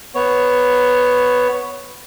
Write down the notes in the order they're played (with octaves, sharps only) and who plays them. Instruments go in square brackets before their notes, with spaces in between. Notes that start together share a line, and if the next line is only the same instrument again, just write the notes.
[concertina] B3 C#5